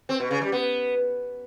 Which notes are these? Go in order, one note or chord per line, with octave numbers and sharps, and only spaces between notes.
C4
B2
C#3
G3
B3